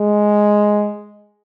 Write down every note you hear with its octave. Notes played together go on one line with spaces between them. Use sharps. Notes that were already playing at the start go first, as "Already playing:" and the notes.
Already playing: G#3